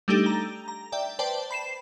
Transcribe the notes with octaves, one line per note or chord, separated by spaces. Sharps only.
G3 A3 D4 D#4 G4 A4
A#5
A#5
D5 E5 G5
B4 C5 D5 G5 A5
B5 C7 E7